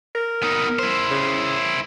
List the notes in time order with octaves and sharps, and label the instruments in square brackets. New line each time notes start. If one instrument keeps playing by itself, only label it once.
[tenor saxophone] A#4
[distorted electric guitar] B3 D#4
E4 C5
[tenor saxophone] C#3